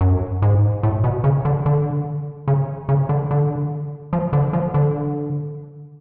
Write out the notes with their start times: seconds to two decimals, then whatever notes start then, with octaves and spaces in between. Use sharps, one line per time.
0.01 F#2
0.42 G#2
0.83 A2
1.04 B2
1.24 C#3
1.45 D3
1.66 D3
2.48 C#3
2.89 C#3
3.09 D3
3.31 D3
4.13 F3
4.33 D3
4.53 F3
4.74 D3